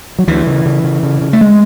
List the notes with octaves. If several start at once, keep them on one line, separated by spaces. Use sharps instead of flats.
F#3
D2 E3
C#3
C#3
C#3
C#3
C#3
A3
G#3